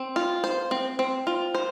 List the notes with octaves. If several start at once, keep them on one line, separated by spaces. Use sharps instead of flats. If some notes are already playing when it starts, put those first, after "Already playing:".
Already playing: C4
F4
C5
C4
C4
F4
C5